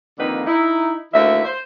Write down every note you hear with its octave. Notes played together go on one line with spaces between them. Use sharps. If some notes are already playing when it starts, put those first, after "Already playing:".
F2 D3 D#3 A#3 D#4 B4
D#4 E4
D2 D#3 A#3 E4 E5
C5